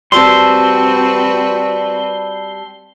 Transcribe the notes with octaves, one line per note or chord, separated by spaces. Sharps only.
G3 C4 F#4 B4 A5 C6 E6